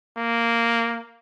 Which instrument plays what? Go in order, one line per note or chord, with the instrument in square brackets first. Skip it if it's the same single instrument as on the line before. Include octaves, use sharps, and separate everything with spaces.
[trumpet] A#3